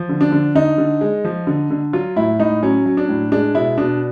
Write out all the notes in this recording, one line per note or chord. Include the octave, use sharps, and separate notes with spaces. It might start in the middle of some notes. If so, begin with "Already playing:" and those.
Already playing: F3
D3
D4
D3
D3 D#4
D3
G#3
F3
D3
D3
F#3 F4
A2 E4
A2 D#4
F#3 C#4
F#3
D4
A2
G#3 D4
B2 E4
B2 D4